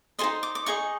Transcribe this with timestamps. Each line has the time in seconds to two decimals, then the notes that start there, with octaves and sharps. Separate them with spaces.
0.19 D#4 G#4 C5 D#5 C6
0.43 D6
0.55 D6
0.66 D#4 G#4 D#5 C#6